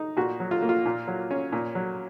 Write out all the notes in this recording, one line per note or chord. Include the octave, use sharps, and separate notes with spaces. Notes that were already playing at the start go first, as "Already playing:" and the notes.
Already playing: D#4
A#2 F#4
F#3
F4
A#3
F4
A#2
F#3
C#4
A#2
F#3